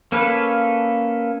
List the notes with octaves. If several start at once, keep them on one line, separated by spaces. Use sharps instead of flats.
A#3 C#4 A4 B4 F5